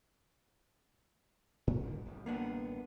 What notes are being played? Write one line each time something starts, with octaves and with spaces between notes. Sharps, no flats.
G#2 C#4
G1 D3 D#3
D1 A1 G3
A#3 B3 D4